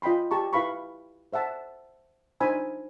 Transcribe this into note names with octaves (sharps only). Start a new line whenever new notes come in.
F4 D#5 G5 B5 C6
G4 A5 A#5 C#6
E4 B4 F5 B5 C#6
C5 E5 F#5 A5
D4 D#4 C5 G#5 B5 E6